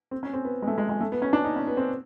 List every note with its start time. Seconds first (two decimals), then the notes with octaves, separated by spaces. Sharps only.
0.11 C4
0.23 C#4
0.33 C4
0.45 B3
0.62 G#3
0.67 A3
0.78 G#3
0.89 G#3
1.01 A3
1.12 B3
1.22 C#4
1.33 D4
1.45 D#4
1.56 C#4
1.67 B3
1.77 C4